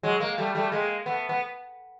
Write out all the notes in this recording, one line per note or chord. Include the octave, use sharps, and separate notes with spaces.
F#3 G#3
G#3 A#3
G3 A3
G3 A3
G#3 A#3
A3 B3
B3